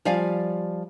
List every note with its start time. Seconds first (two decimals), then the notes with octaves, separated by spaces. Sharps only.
0.05 F3 G3 D5 F5 G#5